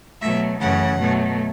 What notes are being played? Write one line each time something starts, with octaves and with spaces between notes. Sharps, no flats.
B2 F#3 A3 E5
F#2 C#3 E3 A3 F#5
B2 F#3 A3